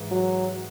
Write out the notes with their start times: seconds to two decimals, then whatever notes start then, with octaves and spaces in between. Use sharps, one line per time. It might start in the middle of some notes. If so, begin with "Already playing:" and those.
Already playing: G#2 E3
0.11 F#3